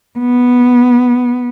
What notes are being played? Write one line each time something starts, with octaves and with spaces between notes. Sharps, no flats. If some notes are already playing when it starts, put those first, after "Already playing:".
B3